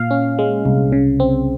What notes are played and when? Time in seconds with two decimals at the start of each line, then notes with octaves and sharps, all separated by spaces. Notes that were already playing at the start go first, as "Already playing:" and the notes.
Already playing: A#2 F5
0.11 C#4
0.39 G#3
0.65 C2
0.92 C#3
1.20 C4